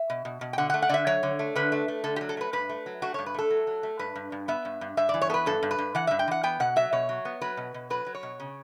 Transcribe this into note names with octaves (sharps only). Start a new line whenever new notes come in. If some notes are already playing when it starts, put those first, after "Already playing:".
Already playing: E5
B2
B2
B2
G5
D3 F#5
F#5
A3
F#5
D3 D5 E5
F#3 C#5
D3
A3
D3 B4
A3
A3
D3 A4
G4
F#3
A4
A3 B4
G2 B4
A3
F#3
A3 F#4
G2 C#5
B4
A3 A4
F#3
F#3
A3
G2 B4
G2
G2
B3 E5
G2
G2
G2 E5
E3 D5
C#5
B3 A4 B4
G2 A4
G2
B4
G2
E3 F#5
G2 E5
G5
E3 F#5
B3 G5
B2 F#5
F#3 E5
B2 C#5
F#3
B3
F#3 B4
B2
B2
F#3 B4
F#3
C#5
B2
C#3